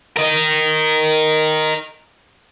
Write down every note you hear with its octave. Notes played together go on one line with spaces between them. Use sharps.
A#4 D#5